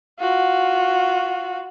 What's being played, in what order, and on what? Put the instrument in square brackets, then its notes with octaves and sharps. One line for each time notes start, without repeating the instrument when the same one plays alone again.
[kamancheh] F4 F#4